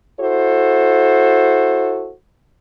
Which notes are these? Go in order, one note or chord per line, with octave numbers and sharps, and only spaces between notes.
E4 F#4 A4 C5